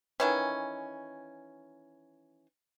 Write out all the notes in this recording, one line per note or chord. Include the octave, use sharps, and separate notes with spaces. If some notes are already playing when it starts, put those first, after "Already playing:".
D#3 E3 C#4